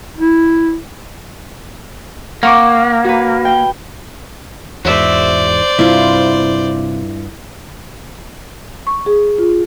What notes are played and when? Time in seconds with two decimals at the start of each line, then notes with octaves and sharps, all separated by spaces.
0.17 E4
2.43 A#3 F#5 C#6 D6
3.04 F#4 B4
3.45 G5
4.85 E2 G#2 F#4 C5 D5 E5
5.79 G2 C3 E4 F4
8.87 C#6
9.06 G#4
9.38 F4